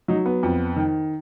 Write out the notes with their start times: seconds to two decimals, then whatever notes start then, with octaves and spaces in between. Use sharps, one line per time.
0.08 F#3 D#4
0.26 B3
0.43 F2
0.76 D#3